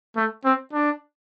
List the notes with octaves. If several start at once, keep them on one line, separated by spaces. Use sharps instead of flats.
A3
C4
D4